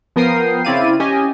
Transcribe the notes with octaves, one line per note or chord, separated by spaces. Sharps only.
F3 B3 A#4 G5 D#6 C7
C#3 C4 E4 D5 F5 D#7
C#4 G4 D#5 G#5